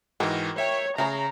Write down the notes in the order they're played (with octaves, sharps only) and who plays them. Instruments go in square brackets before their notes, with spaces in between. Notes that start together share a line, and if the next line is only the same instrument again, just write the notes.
[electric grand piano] G#2 E3 [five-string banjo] D#3 F#4 A#4
[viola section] C#5 [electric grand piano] E5 G5
[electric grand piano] C#3 [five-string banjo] A3 G#4 C#5 [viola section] A#5